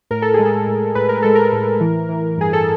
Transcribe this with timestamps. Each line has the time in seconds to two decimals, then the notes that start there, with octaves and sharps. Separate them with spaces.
0.11 A2 A#4
0.22 A4
0.34 G#3 G#4
0.45 A4
0.67 A2
0.95 A2 B4
1.09 A#4
1.22 G#3 A4
1.35 A#4
1.53 A2
1.80 E3
2.09 E3
2.37 G2 G#4
2.53 A4